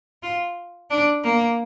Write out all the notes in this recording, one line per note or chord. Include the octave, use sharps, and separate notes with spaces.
F4
D4
A#3